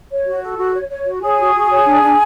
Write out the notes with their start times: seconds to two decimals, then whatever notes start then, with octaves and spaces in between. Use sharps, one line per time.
0.11 C#5
0.26 F#4
0.42 A4
0.58 F#4
0.74 C#5
0.89 C#5
1.06 F#4
1.21 G#4 C#5 G#5
1.38 F#4
1.54 F#4
1.70 C#5
1.85 D4
2.01 D4